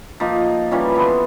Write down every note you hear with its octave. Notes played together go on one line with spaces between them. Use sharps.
F3 A#3 D#4
E3 F3 G3 C#4
B3 A4 C6